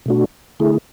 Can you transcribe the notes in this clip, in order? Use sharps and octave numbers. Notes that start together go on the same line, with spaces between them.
B2 A3 D4 F#4
D3 A3 E4 G#4